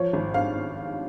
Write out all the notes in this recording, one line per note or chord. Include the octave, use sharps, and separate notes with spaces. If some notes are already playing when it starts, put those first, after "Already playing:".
Already playing: F3 C#5
G#1
G2 F5